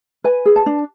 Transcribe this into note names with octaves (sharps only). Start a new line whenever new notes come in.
B4 G#5
G#4
A5
D4